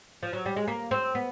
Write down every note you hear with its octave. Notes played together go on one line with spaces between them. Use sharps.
F3
F#3
G3
G#3
A#3
C4
B3